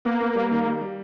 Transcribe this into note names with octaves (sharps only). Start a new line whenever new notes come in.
A#3 B3
B3
G3
D#3
G3
G3